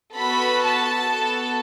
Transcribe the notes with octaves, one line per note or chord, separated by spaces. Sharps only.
B3 F#4 A4 B5
A5
B3 F#4 A4